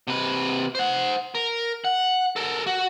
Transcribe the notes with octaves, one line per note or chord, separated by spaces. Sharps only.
C3 B4
C5 F#5
A#4
F#5
A4 A#4
F#4